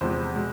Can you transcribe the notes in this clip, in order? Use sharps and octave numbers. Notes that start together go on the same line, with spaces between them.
E2 C3 F3 G#3 C5
B2 G#3